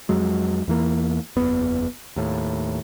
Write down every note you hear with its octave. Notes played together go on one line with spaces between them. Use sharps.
F2 F#3 G#3
E2 E3 A#3
F#1 E2 B3
D#2 A2